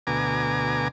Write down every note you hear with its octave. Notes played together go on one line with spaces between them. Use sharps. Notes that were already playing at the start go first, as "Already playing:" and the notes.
D2 B2 G#5 A#5 D6